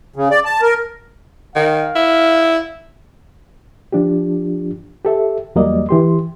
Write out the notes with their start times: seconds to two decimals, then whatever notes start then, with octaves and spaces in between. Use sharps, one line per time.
0.16 C#3
0.31 D5
0.45 A5
0.62 A#4
1.55 D#3 F5
1.95 E4
3.92 F3 D4 F4 G4
5.05 G4 A4 E5
5.55 E2 F#3 G3 A#3 D5 D#5
5.89 E3 G4 C6